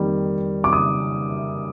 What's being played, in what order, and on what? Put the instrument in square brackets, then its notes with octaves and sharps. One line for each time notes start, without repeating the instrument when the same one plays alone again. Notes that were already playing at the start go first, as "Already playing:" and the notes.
Already playing: [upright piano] F2 D#3 G3 A#3
D6
D#6